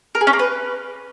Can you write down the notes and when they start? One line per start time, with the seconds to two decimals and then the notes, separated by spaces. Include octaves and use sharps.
0.15 A#4
0.21 G#4
0.27 C#4
0.33 A#3
0.39 B4